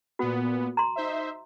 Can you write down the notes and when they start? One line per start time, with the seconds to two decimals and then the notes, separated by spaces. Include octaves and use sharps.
0.19 A#2 B3 F#4
0.77 A#5 C6
0.96 D#4 C5 E5